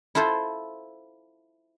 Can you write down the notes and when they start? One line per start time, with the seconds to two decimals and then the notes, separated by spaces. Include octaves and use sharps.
0.15 E4 F4 A4 C5